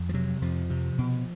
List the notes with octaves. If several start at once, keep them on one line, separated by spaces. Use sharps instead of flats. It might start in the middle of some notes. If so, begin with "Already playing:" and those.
Already playing: F2
F3
C3 F#3
F2 F3
C3
B2